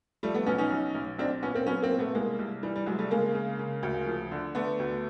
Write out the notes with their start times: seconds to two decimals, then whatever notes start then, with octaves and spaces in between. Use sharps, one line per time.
0.23 F3 G3 A3
0.34 A3 B3
0.46 B1 B3 C#4
0.58 C#4 D#4
0.71 B1
0.95 B1
1.19 B1 C4 D4
1.43 A#2 B3 C#4
1.54 A#3 C4
1.66 F#3 B3 C#4
1.82 A#3 C4
1.91 A#2
1.99 A3 B3
2.15 C2 G#3 A#3
2.39 C2
2.63 E3 G3
2.76 G3
2.86 C2 F#3 G#3
2.99 G3 A3
3.11 C#3 G#3 A#3
3.34 C#3
3.59 C#3
3.83 D2
4.06 F3
4.32 D3
4.55 D3 A3 B3
4.79 D2